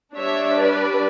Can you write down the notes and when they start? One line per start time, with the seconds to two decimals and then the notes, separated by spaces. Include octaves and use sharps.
0.16 G3 D4 C#5 E5
0.59 B4 D5